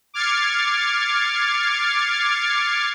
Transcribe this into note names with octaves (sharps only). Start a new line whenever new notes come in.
D6 F6 G#6 A6 C7 C#7